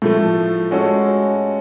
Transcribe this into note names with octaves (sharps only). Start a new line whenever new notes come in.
A2 F3 A3
G#3 C#4 F#4 A4